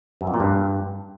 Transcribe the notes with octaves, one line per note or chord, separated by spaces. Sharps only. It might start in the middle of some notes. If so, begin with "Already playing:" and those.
F#2
F2
A#2
G2